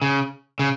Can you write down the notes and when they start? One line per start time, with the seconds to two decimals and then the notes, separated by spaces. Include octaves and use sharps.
0.02 C#3
0.59 C#3